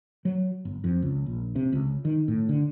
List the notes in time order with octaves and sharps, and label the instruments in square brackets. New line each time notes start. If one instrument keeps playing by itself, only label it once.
[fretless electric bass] F#3
G1
F2
C#2
A#1
C3
C#2
D#3
A2
D3